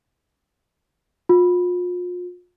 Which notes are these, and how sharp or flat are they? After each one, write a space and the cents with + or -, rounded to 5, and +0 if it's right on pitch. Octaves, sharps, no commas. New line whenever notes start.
F4 +35